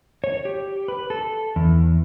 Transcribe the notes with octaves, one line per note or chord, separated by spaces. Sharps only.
C#5
G4
B4
A4
E2